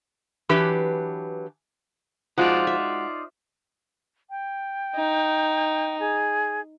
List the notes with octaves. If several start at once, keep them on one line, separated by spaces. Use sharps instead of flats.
E3 F#3 D4 G4 B4
F3 G#3 D#4 F4 F#4 D5
E5
G5
D#4
G#4